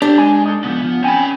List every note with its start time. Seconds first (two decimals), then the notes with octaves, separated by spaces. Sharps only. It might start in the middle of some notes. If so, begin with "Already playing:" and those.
0.02 D4 G4 A4
0.18 G#3 G#5
0.46 D#4 A4
0.64 C#2 F3 B3
0.80 E3 F3
1.04 C4 C#4 G5 G#5 B5